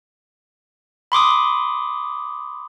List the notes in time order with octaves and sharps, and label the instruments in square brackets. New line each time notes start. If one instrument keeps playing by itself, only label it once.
[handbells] B5 C6 D6 D#6